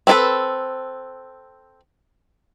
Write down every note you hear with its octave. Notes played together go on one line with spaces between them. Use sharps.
C4 C#4 E4 A4 B4